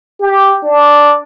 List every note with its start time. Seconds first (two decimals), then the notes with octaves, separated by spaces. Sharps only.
0.20 G4
0.63 D4